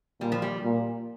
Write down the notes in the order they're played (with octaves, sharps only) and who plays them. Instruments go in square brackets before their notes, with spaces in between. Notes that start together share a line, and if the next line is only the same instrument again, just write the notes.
[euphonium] A#2 [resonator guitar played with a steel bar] G3
[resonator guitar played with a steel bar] F3
G3
[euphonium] A#2